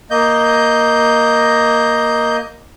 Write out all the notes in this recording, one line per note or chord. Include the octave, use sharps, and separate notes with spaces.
A#3 D#5 G6